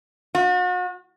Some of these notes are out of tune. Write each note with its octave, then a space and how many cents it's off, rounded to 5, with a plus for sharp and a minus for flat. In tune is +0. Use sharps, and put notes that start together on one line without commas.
F#4 -40